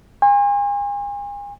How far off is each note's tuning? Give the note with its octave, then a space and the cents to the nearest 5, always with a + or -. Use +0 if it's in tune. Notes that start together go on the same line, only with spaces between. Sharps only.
G#5 -40 C6 +40